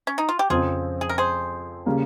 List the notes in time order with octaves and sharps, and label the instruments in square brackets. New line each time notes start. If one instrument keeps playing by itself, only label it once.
[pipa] C#4
D#4
F4
G4
[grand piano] F2 C#3 F3 C4 [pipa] F4 G#4
[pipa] G#4
A#4
G#4 C5
[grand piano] C#3 G3 A#3